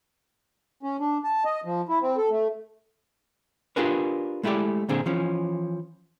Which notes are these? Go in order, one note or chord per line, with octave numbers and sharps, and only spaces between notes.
C#4
D4
A5
D#5
F3
E4
C4
A4
A3
D4 F4 G4 G#4 A#4 B4
G#3 A3 E4 F#4 G4 D5
A#2 D3 C4 G#4
E3 F3 C#4